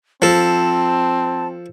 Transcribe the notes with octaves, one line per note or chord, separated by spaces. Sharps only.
F3 C4 A4 A5